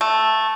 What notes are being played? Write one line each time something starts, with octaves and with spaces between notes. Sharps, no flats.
A3